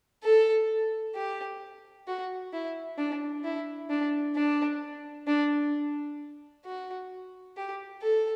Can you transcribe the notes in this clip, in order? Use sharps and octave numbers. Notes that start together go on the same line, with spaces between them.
A4
G4
F#4
E4
D4
E4
D4
D4
D4
F#4
G4
A4